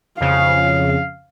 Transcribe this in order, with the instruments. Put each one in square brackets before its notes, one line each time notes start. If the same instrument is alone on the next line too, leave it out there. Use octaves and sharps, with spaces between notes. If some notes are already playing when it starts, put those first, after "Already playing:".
[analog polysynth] F2 C#3 [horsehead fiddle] F5